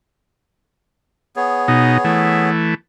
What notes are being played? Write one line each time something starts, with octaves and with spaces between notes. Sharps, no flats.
B3 G#4 C#5
B2 D#4
E3 A3